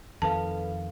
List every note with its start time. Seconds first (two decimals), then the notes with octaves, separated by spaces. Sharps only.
0.22 F2 D#3 A4 B4 F5 A5